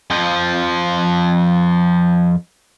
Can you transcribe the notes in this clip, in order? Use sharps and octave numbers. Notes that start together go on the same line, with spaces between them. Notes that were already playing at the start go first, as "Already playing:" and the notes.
F2 F3